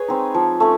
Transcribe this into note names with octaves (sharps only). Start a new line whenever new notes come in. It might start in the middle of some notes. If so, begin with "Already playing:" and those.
Already playing: G#4 B4 C#5
G#3 C4 D#4
F3
A3 C#4